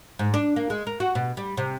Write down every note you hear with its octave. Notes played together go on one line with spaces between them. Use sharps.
G#2
D4
A#3
G#3
A#4
F#4
B2
G3
C3